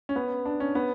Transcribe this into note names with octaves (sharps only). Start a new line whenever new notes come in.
C#4
B3
D4
C#4
B3